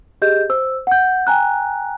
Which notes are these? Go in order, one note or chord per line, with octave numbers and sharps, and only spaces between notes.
G4 G#4 D#5 G6
C5 E6
F#5 G6
G5 G#5 A#5 F#6